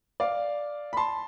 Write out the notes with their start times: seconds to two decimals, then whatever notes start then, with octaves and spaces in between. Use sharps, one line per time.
0.20 D5 F5
0.93 B5
0.97 A5 C6